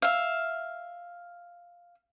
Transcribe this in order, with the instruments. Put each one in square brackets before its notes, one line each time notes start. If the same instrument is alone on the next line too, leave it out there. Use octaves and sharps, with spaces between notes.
[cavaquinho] E5 F5